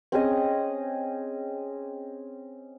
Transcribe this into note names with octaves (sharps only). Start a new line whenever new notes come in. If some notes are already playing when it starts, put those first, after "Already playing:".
C4 C#4 G#4 D#5